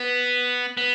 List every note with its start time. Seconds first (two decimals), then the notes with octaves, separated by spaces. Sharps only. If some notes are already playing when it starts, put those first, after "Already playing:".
Already playing: B3
0.77 B3